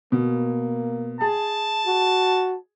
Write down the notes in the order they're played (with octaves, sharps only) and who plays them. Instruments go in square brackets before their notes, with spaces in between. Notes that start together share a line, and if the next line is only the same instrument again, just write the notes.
[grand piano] B2 [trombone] A#3
[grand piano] G#4 [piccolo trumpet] A5
[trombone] F#4